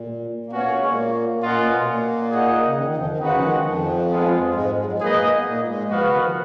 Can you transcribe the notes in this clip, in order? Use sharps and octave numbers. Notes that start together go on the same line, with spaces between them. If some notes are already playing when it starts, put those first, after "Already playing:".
Already playing: A#2
A#3
B2 B3 C#4 F#4 C#5 F5
A#2 A#3
G#3
A#2 A#3
A#2 A#3 C#4 F4 A#4 D#5 F#5
A#3
B2 B3
A#2 A#3
D#4 G#4 D#5 F#5
C#3
D#3
D#3
F2 F3
D#3
C#3 G#3 D#4 F#4 B4 F#5
F3
D#3
F2 F3
G#3 B3 F4
G#2 G#3
G#3
F#3
G#2 G#3
A#2 A#3 D#4 G#4 B4 D#5
B3
A#2 A#3
G#2 G#3
F2 F3 B3 F#4 B4 F5
C#3
D#3
F3